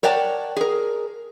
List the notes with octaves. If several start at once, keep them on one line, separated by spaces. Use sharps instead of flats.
A#4 C#5 D5 F#5 G5 A5
G#4 A#4